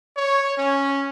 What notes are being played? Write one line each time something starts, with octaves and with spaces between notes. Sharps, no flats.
C#5
C#4